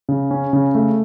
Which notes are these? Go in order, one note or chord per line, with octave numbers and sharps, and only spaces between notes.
C#3
C#4
C#3
A3